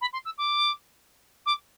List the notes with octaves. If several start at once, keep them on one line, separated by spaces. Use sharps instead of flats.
B5
C6
E6
D6
D6